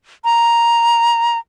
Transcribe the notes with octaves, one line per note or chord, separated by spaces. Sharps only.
A#5